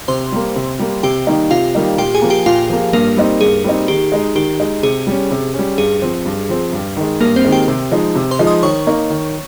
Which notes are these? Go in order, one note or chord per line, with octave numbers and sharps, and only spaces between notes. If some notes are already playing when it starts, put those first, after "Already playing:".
C3 C5 C6
G3 A#3
C3
G3 A#3
C3 G4 G5
D#3 G3 A#3 D#4
C3 F4 F5
D#3 G3 A#3 D#4
A#2 G4 G5
G#4 G#5
F3 A#3
G4 G5
A#2 F4 F5
F3 A#3
G2 A#3 A#4
G3 C4 D#4
G2 G#4
G3 C4 D#4
D#3 G4
G#3 D#4
D#3 G4
G#3 D#4
C3 G#4
G3 C#4
C3
G3 C#4
G2 G#4
F3 C4
G2
F3 C4
G2
D#3 G#3
G2 A#3 A#4
C4 C5
D#3 G#3
G4 G5
C3
F3 G#3 D#4
C3
C5 C6
F3 G#3 D#4
D#5 D#6
D#3 C#5 C#6
A#3 D#4
D#3